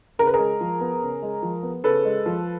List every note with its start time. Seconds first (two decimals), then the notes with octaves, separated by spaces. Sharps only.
0.19 C#3 A#4
0.27 B4
0.34 G#4 A#4
0.39 G#3
0.60 F3
0.81 B3
1.02 C#3
1.22 G#3
1.42 F3
1.63 B3
1.84 C#3 A4 B4
2.05 G#3
2.26 F3